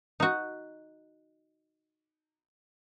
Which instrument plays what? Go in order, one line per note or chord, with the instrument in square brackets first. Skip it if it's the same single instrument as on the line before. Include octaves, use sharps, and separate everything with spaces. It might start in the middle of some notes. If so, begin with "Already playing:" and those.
[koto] D#4 F#4